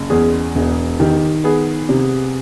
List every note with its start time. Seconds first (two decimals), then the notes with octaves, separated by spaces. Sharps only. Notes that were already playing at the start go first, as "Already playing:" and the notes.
Already playing: F#1
0.10 E2 G#4
0.55 E1
1.00 D#3 G4
1.44 B3 G#4
1.89 C3